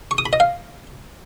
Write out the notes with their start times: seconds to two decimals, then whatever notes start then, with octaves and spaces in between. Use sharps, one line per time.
0.11 C#6
0.18 D#6
0.26 B5
0.33 D#5
0.40 F5